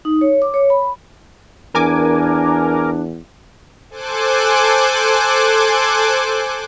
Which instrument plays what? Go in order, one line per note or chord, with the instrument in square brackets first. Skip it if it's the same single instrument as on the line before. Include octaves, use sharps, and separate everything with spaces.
[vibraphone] D#4
C#5
D6
C#5
B5
[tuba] E2 [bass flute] D4 [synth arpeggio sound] A#4 G#5 D6
[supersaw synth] A4 C5 G#5 D6 F#6